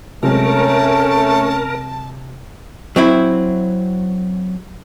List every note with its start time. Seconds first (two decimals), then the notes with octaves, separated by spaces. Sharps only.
0.23 C3 F#3 G#3 A3 C#4 A#4 A5
2.96 F#3 C4 E4